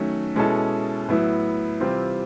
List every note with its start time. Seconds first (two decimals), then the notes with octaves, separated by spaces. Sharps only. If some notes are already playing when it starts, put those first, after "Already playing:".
Already playing: D#3 F#3 A3 C#4
0.35 B2 G#3 C#4 E4 A4
1.09 A2 F#3 B3 E4
1.80 C3 E3 G3 C4 F4